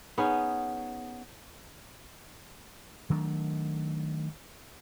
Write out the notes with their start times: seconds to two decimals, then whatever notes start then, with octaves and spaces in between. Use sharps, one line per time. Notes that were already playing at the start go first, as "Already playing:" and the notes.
0.18 B3 C#4 D#4 G#4
3.10 D#3 F#3 A3 D4